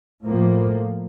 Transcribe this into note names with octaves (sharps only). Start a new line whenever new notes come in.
A2 F3 A#3